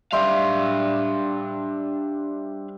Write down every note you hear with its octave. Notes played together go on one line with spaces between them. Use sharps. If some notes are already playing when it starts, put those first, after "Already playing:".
G3 D4 C5 E5 F5